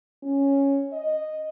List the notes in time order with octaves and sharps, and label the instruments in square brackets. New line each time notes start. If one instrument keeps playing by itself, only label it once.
[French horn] C#4
D#5